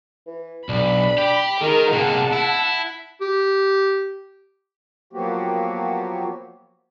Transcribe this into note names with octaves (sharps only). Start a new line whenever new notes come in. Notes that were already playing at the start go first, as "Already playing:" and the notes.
E3
B1 D4 B5
G4
D#3 G#3 D#4 A#4
C3 A#3 F#5 A5
E4
G4
F3 F#3 A#3 B3 F#4 G4